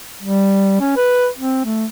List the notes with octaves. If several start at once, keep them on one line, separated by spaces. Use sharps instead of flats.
G3
C#4
B4
C4
A3